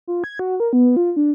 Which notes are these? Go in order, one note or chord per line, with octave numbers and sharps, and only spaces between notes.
F4
G#6
F#4
A#4
B3
F4
D4